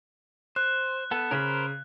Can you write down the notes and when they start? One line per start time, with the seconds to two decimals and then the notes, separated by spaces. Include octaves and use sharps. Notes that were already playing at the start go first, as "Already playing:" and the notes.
0.56 C5 F#6
1.11 B3 A4
1.31 C#3 A#4 C5 B5